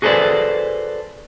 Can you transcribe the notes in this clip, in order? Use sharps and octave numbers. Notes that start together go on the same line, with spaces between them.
F#4 G#4 A4 B4 C5 D5